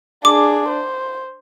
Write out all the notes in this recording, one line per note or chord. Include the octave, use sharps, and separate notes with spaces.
D4 G#4 D6
C5